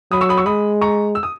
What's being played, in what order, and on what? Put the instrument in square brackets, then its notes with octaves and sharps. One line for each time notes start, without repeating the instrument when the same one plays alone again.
[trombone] F#3 [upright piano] B5 D#6
[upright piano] C#6 E6
B5 D#6
C#6 E6
[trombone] G#3 [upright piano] B5 D#6
[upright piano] A#5 C#6
E6
D#6